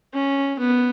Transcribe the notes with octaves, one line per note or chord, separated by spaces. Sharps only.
C#4
B3